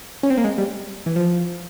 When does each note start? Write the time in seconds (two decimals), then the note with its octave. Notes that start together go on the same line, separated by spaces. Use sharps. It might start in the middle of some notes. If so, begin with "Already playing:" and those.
0.23 C#4
0.30 C4
0.37 A#3
0.44 G#3
0.58 G3
1.06 E3
1.16 F3